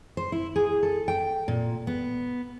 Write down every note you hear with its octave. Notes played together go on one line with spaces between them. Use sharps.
C5
E4
G#4
A4
G5
A#2
B3